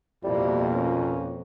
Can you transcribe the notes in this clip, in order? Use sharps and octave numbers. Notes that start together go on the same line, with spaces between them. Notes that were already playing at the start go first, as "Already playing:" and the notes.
F2 B2 G3 A#3 E4
A#2 C#4